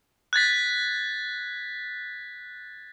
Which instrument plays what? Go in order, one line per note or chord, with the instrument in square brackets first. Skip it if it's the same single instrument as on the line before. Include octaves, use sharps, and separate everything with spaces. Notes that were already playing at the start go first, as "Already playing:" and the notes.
[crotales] F#6 G#6 A6 B6